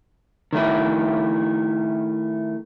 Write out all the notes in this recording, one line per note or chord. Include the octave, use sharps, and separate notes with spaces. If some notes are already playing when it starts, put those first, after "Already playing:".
D#3 A3 E4